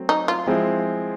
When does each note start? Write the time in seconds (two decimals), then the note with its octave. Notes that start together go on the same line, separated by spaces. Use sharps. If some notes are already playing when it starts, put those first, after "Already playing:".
Already playing: F#3 A3 C4
0.09 D#4
0.28 F4
0.47 F3 G#3 C4 E4